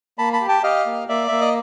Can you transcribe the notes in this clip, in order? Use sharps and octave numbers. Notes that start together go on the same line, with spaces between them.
A#3 A5 B5
A5 B5
G4
G5 A5
G4 D#5 F5
A#3
A#3 D5 E5
A#3 E5
D#5